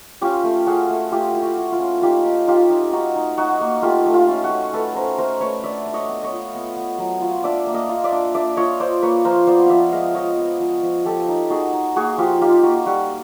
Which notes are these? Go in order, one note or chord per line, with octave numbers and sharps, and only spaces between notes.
C#4 F4 G4
A3
C#4 F#4 G#4
A3
A3 F4 G4
E4
F#4
E4
F4
C#4
D#4 F4 G4
D#4
D#4 F4 G4
D#4
D#4 F#4
D#4
D#4 F#4
A#3
A3 F4 G4
A3
F4
C#4
F#4
C#4
A3 A4 B4
C#4 A#4 C5
A3 A#4 C5
A3 B4 C#5
D4 D5 E5
D4
C#5 D#5
B3
C#5 D#5
F4
B3
B3
F#3
F4
D4 D5 E5
A#3
D#5 F5
F4
D5 E5
D4
D4 D5 E5
F4 C#5 D#5
F4 C5 D5
A#3 B4 C#5
F3 A#4 C5
B3 C5 D5
F3 D5 E5 F5
G#3 D#5 F5
F3 C#5 D#5
B3
F3
F3
F3 G4 A4
D#4
D#4 F#4 G#4
D#4
A#3 F#4 G#4
F3 F4 G4
D#4 F4 G4
A#3 F#4
G3 F#4